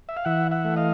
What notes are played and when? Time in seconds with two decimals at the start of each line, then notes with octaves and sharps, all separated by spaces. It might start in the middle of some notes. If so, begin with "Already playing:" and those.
0.09 E5
0.17 F5
0.25 E3 E5 F#5
0.51 E5 F#5
0.65 A3
0.76 D#5 F5